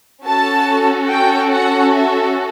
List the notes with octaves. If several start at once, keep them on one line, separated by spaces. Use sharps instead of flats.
C#4 F#4 A4 A5
G5
F#5
E5